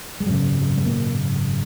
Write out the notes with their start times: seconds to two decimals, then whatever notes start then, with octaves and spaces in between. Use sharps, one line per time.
0.20 G#3
0.26 G#1 F#2 C#3 F#3
0.77 G#3
0.85 A#2 A#3